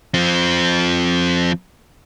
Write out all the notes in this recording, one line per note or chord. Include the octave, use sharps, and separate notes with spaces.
F3 C4